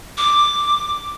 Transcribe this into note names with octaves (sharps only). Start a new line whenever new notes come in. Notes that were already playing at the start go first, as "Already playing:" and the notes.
D6